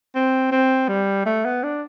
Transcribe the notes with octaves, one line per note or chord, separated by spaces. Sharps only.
C4
C4
G3
A3
B3
D4